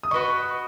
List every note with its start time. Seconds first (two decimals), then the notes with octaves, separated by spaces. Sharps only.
0.03 D#6
0.11 F#4 B4 D#5 C#6